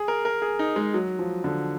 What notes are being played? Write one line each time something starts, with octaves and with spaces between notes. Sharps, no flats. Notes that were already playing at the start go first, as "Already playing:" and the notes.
Already playing: G#4
A#4
A#4
G#4
D#4
G#3
F#3
F3
D3